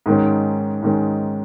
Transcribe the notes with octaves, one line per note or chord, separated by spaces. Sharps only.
G#2 D#3 G#3 C#4
G#2 D#3 G#3 C#4